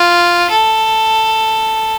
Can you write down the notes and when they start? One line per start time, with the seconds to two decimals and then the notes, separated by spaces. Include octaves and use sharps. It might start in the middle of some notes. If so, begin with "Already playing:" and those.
Already playing: F4
0.50 A4